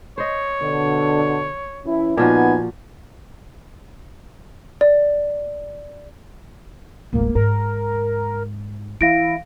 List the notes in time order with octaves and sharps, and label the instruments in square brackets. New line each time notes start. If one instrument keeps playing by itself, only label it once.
[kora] C5 D#5 [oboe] C#5
[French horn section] B2 D3
E3 C#4 E4
[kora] A#2 F3 F#4 [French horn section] B3 D#4 [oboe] G#5
[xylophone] D5
[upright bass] D1 G#1 [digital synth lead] A#3
[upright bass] G#2 [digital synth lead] A#4
[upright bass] E3 [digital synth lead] E4 [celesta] F5 A#6 D7